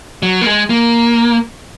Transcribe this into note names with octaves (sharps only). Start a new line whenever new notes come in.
F#3
A#3
G#3
A#3